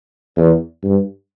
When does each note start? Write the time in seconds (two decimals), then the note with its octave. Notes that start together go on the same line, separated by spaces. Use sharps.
0.37 E2
0.84 G2